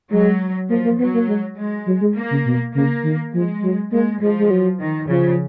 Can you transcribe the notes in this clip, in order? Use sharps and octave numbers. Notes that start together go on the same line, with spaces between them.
F#3 G#3
F3 A#3
A#3
F#3 B3
A#3
G#3
G#3
F#3
G#3
A#3
C#3
B2
C#3 A#3
D#3
F3 G#3
F#3
G#3 A#3
F3 G#3
G#3
F#3
D#3
C#3 F3